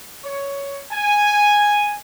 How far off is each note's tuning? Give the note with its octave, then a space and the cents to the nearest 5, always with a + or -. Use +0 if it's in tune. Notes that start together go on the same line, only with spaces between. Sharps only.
C#5 +10
G#5 -5